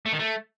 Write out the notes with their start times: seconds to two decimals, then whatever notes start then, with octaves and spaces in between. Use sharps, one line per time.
0.06 A3
0.13 D#3
0.19 A3